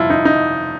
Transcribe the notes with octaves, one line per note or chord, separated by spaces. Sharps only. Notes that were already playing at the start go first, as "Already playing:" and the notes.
Already playing: G1 F2 C3 E4 F4
D#4
D#4